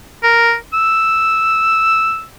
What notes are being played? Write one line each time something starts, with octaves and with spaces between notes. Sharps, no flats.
A#4
E6